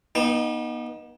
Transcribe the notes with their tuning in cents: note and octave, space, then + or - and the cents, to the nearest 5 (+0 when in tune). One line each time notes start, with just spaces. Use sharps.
B3 -45 D#4 -5 G5 +0